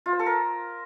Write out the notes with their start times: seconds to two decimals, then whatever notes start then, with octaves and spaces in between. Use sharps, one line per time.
0.06 F4
0.13 C5
0.19 A4
0.26 A#4